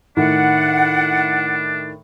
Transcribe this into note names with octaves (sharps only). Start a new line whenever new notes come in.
A2 D#3 D4 F#5